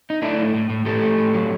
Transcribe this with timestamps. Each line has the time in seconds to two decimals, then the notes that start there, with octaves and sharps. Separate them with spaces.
0.10 D#4
0.22 A3 D4 E4
0.38 A2
0.54 A2
0.70 A2
0.85 A2 G4 A4
1.02 A3
1.18 A2
1.34 F#3